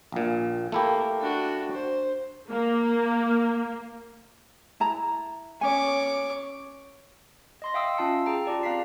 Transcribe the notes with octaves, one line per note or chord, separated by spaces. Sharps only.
A#1 A#2
A3 A#3 E4 G4
D4 F#4
C5
A#3
E4 A5 A#5
C#4 C#5 G#5 D6
D#5 C6 A#6
E5 F5 G5 D#6 E6
C#4 F4 F5 A5 E6 C#7
G#4 G5 A#5
F4 G4 D5 A5
C4 F5 A#5 B6 C7